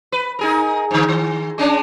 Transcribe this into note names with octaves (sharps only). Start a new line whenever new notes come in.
B4
D#4 G#4 A#4
G#2 D3
D#3
G#3 C#4 D4